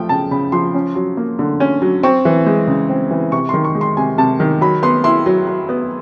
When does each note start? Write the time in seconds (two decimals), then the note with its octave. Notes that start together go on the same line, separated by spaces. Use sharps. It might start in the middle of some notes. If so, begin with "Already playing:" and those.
Already playing: F3 A3 G5
0.09 C#3 A5
0.31 C#3 B5
0.52 F3 C6
0.74 C#4
0.95 F#3
1.17 A#3
1.39 D3
1.60 C#4
1.82 F#3
2.03 C4 C#6
2.25 E3
2.47 G#3
2.68 C#3
2.89 C4
3.11 E3
3.32 C3 C#6
3.49 D#3 C6
3.64 C#6
3.75 G#3
3.81 C6
3.97 C3 G#5
4.18 C3 A5
4.40 D#3
4.61 F#3 B5
4.83 B3 C6
5.04 E4 C6
5.26 F#3
5.47 F#3
5.69 B3